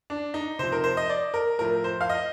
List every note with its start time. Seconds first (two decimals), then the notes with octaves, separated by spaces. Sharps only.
0.10 D4
0.34 D#4
0.59 C3 F3 C5
0.72 A#4
0.84 C5
0.97 D#5
1.10 D5
1.34 A#4
1.59 A2 F3 A#4
1.84 C5
2.01 F5
2.09 D#5